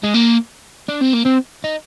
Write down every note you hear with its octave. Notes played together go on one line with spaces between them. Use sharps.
G#3
A#3
D4
C4
A#3
C4
D#4